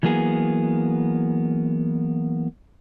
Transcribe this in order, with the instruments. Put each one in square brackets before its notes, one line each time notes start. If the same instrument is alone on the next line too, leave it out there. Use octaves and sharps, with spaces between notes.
[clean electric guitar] E3 F#3 A#3 B3 G#4